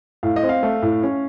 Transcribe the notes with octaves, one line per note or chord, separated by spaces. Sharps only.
A2 F5
D#5
C4
F5
A3
A2
C#4